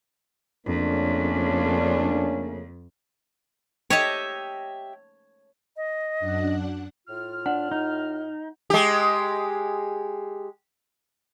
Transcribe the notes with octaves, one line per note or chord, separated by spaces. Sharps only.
F2 C#3 A3 A#3 C#4 D4
G4 C#5 D#5 E5 A5
D#5
F#2 D4 F#5
A2 F4 F6
D4 F#5
D#4
G#3 G4